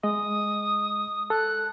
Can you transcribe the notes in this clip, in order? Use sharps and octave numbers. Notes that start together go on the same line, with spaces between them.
G#3 D#5 D#6
A4 F#6